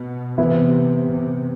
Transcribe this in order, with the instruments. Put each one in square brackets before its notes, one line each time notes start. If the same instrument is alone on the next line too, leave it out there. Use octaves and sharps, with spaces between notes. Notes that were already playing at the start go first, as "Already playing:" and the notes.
Already playing: [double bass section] B2
[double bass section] C3 [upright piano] E3 B3 E4
[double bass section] C3